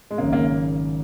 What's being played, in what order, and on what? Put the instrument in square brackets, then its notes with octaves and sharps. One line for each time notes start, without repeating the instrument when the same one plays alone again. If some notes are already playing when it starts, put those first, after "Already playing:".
[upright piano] G#3
[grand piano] G#1 F#2 C#3 [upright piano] A#3
[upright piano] A#3